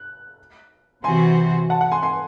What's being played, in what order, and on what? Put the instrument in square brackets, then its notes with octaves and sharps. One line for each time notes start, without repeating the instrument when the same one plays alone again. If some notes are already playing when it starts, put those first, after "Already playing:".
Already playing: [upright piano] F#6
[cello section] C3 E3 C4 F#4 C5 [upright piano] G#5 C6
[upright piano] F#5 A5
F#5
G#5 C6
G#5 C6